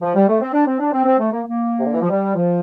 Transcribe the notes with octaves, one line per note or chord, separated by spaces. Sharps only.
F3
G3
A3
C4
D4
C4
D4
C4
C4
A3
A#3
A#3
C3
D3
E3
F3
G3
F3